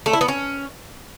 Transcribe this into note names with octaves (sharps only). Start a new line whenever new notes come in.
A3
E4
B3
C#4